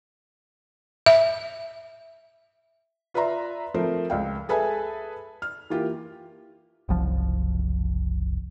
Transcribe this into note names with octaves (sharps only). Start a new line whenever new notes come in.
E5
F4 B4 D5 E5 A#5 C6
F3 A3 C4 A#4 C5
C#2 F5 G5
G#4 A4 B4 E5 G#5 A5
F6
E3 A#3 F4 G4
F#1 C2 F3